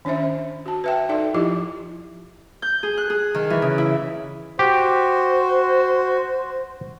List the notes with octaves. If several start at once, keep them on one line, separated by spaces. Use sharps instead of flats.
D#3 C#4 D4 C5 E5
F#4 A5
B4 E5 G5
D#4 A4 D5 E5
F3 E4 F4 G4 D#5
G6
G#4
F#6
G#4
D#3
E3
C#3
E4
F#4 G4 C5